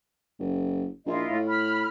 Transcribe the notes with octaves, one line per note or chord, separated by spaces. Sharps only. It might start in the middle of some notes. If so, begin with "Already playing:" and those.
F#1
A#1 E4 F4 D#5
A2
B5 F6